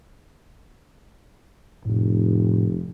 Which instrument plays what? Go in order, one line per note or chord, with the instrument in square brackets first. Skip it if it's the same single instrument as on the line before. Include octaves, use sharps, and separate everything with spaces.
[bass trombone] F1 [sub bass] A2